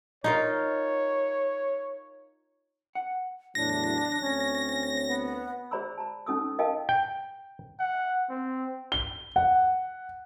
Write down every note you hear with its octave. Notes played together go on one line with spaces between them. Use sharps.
D#4 F4 A#4 C#5
F#5
E2 A2 F#3 D4 A#6
D2 C4 C#4 C#5
B3
G#4 C5 D5 A#5 B5 E6
A5 A#5
C#4 D#4 A4 D#6 E6
A#4 D#5 F5 G5 A5 E6
G5
F#5
C4
G7
F#5